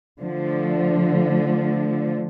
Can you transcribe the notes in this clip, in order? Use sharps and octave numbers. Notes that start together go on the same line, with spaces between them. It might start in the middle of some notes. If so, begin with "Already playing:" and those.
D3 F3 A3